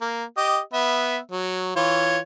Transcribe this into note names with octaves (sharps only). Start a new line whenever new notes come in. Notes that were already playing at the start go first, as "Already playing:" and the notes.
A#3
G4 D#5
B3 E5
F#3
E3 F4 C#5